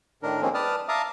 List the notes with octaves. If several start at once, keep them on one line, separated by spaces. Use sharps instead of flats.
A2 D#3 D4 A#4
D#3 F3 G#3 A#3 C4 C#4
B4 D5 A5 D#6 F6
E5 F5 A5 A#5 D6 D#6